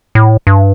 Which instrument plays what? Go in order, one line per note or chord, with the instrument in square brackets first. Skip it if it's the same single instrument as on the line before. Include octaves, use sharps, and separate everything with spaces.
[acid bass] A2
G2